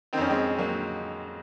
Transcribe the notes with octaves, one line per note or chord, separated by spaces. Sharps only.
F2 D#3 C4 C#4
G#3 C4
F#3 A#3